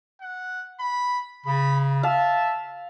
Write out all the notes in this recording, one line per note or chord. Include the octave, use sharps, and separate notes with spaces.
F#5
B5
C#3 B5
E5 F5 A5